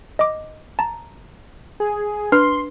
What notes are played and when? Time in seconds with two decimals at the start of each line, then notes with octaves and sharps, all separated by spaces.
0.19 D#5 D6
0.79 A5 A#5
1.80 G#4
2.32 D4 B4 C6 F6